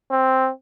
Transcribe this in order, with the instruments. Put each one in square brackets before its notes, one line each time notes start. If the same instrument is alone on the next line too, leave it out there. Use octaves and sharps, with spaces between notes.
[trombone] C4